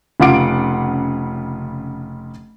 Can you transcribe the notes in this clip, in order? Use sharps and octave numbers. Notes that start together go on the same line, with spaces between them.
F1 C#3 F4 F#5 D6 D7